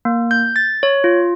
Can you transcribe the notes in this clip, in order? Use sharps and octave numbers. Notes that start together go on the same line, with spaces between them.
A#3
G6
A6
C#5
F4